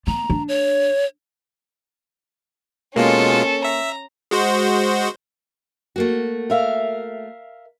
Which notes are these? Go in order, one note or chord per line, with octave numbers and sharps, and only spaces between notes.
B3 A#5
D4
C#5
B2 G#3 A#3 C#4 F4 A4
E5 A#5
G#3 F#4 C5
A3 A#3 F#4
A#4 E5 F5